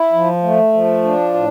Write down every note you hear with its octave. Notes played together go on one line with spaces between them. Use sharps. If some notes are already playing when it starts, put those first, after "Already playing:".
Already playing: E4
F3
A3
F3
D4
A2